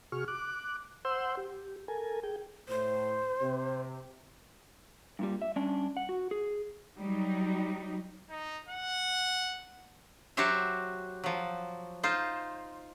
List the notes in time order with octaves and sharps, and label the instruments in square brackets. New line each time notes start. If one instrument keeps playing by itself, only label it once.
[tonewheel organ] C3 F#4 G#4 C#6 F6
D6 F#6
C5 F#5 C6 E6 G6
G4
A4 A#4 G#5
G#4 G5
[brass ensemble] A2 [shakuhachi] C5
[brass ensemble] C3
[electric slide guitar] G2 A#2 G3
E5
G3 C#4 D4
F#5
F#4
G#4
[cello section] F#3 G3 D#4
[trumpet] D#4
F#5
[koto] F#3 F#4 G4 C5 C#5 E5
F3 F#3
D#4 F4 C5